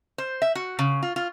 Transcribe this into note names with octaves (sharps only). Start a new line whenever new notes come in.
C5
E5
F#4
C#3
F4
F4